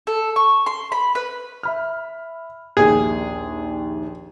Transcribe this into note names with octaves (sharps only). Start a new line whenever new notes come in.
A4
C#6
C6
B5
B4
E5 B5 F6
A#1 D#2 G#4